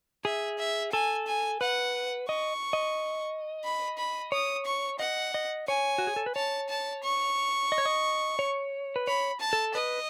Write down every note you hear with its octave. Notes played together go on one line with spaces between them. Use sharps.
G#4 E5
E5
A4 G#5
G#5
B4 F#5
D#5 C#6
D#5
B5
B5
C#5 D#6
C#6
D#5 F#5
D#5
C#5 G#5
F#4
G#4
A4
B4
C#5 A5
A5
C#6
D#5
C#5
D#5
C#5
B4
C#5 B5
A5
A4
B4 D#5